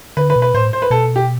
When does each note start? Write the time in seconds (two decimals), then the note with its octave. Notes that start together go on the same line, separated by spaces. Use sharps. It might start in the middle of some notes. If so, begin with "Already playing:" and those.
0.17 D3 B4
0.30 B4
0.36 B2
0.42 B4
0.54 A2 C5
0.73 C5
0.82 B4
0.90 B2 A4
1.16 G4